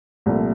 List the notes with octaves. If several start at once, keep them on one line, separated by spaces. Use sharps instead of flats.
C2 A#2 F3 A3